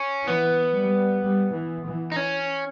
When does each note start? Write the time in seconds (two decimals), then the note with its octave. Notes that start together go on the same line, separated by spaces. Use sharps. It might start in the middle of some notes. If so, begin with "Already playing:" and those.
Already playing: C#4
0.27 E3 B3
0.74 G3
1.23 G3
1.54 E3
1.86 E3
2.12 D#4
2.16 C#4